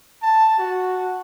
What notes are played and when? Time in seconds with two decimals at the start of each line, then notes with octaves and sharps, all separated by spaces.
0.23 A5
0.59 F#4